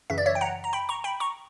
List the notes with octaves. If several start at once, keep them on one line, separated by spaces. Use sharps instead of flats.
F#2 C#3 E3 E5
D5
C#5 E5
G5
F#5 A#5
A#5
G5 B5
A#5 C#6
G5 B5
A#5 C#6